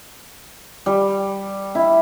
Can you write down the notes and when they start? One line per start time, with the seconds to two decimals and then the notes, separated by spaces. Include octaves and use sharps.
0.86 G3
1.75 E4